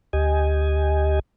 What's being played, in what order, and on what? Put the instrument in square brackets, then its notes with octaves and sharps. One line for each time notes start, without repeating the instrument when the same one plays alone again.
[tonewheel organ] D2 G4 D#5 G#5